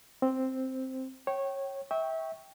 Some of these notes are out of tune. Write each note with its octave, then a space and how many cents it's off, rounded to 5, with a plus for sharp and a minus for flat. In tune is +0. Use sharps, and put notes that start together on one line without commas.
C4 +0 C5 +0
C#5 -20 G5 -25
E5 -25 G5 +0 C#6 +0